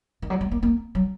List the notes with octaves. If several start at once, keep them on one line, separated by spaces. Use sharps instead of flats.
D#3
F#3
G#3
A#3
A#3
F#3